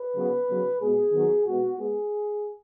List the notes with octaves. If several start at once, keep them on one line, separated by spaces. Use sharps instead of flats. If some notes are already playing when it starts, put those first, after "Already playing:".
Already playing: B4
C#3 F#3 B3
C#3 F#3 B3
B2 G#3 B3 G#4
D#3 F#3 B3
B2 G#3 B3 F#4
G#3 B3 G#4